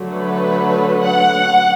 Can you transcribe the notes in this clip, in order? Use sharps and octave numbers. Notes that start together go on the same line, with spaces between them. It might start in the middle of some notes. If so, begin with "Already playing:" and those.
Already playing: D3 F#3 A3
B4
F#5